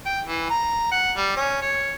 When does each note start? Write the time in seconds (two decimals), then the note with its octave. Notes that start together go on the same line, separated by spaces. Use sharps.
0.06 G5
0.28 E3
0.50 A#5
0.92 F#5
1.17 G3
1.37 C#4
1.62 C#5